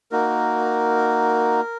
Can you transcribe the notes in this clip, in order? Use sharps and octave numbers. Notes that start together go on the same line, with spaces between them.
A#3 D#4 F#4 A#4